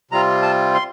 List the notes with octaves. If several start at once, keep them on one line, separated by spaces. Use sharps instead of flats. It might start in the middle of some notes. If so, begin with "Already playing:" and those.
C3 G3 C4 F4 A#5
A5
C6